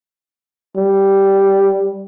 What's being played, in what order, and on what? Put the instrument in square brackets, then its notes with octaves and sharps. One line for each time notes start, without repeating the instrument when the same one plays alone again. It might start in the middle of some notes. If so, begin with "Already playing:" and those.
[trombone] G3